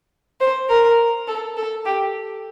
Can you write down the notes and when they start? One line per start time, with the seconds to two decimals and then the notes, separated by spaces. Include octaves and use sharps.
0.40 C5
0.70 A#4
1.28 A4
1.57 A4
1.85 G4